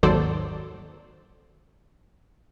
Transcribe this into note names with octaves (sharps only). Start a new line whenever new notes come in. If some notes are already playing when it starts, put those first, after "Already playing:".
G#1 D#2 F#3 A4 C5 D5